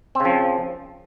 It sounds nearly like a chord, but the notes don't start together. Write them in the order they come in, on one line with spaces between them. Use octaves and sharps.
C4 C#3 F3